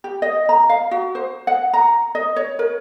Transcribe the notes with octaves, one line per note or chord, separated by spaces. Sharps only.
G4
D#5
A#5
F5
F#4
C5
F#5
A#5
D#5
C#5
A#4